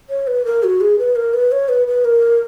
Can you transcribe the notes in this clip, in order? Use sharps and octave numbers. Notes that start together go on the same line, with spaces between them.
C#5
B4
A#4
F#4
G#4
B4
A#4
B4
C#5
B4
B4
A#4